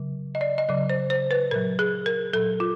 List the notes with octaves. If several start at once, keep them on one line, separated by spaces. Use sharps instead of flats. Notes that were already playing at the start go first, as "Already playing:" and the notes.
Already playing: C#3 F#3
D#5
D5
D#5
C#3 F#3 D5
C5
C5
B4
A#2 F#3 A#4
G#4
A#4
A#2 F#3 A4
F4